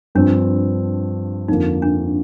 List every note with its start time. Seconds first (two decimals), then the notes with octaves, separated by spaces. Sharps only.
0.15 G2 F3 C4 D4
1.48 F2 D3 F3 A#3 D#4 F4
1.82 D4